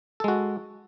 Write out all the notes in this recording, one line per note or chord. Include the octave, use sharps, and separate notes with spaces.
G#3 F#4 A4